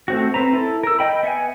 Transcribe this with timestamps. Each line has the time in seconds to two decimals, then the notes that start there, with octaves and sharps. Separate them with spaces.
0.08 A3 C4 F#4
0.34 C4 B4 A#5
0.53 E4 A4
0.83 A#4 E6
0.99 D#5 G5 B5
1.23 B3 E5 F#5 G#5